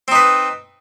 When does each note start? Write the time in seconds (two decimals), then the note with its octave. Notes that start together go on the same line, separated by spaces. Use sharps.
0.08 C4
0.12 D#4
0.15 B4